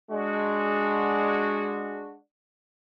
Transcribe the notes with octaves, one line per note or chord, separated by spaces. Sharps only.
G#3 D4 F#4